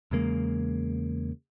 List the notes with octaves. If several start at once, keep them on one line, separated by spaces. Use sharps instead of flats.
E2 C#3 G#3 A#3